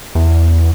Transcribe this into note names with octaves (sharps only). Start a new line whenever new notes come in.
E2